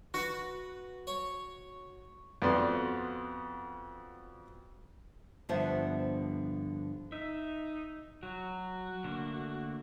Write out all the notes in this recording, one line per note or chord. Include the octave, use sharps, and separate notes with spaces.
F#4 B4
C#5
F2 B3 F#4 D5 C6
G2 D3 F3 B3 C5 E5
D#4 E5
F#3 F#4
D3 A3 A#3